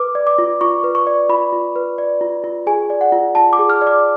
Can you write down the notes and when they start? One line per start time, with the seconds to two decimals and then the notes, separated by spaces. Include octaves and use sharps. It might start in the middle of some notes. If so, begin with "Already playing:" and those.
Already playing: B4 D6
0.15 D5
0.27 D6
0.38 F4
0.61 F4 C#6
0.84 B4
0.95 C#6
1.07 D5
1.29 F4 B5
1.52 F4
1.76 B4
1.98 D5
2.21 F4
2.44 F4
2.67 G#4 G#5
2.90 D5
3.01 F#5
3.12 F4
3.35 F4 A5
3.53 D6
3.59 G#4
3.70 F6
3.82 D5
3.87 D6